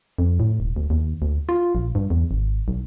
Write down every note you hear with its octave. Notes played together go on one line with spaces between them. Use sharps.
F2
A2
D#1
D2
D#2
D2
F4
A#1
G2
E2
G#1
B1